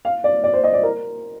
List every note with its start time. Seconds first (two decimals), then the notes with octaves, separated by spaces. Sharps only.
0.05 F5
0.24 D5
0.44 D5
0.54 C5
0.64 D#5
0.73 D5
0.83 A#4